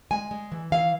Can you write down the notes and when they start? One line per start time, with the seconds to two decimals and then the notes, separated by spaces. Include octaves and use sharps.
0.11 G#3 G#5
0.31 G#3
0.52 E3
0.72 E3 F5